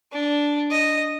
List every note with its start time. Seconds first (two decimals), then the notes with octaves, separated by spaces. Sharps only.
0.12 D4
0.71 D#5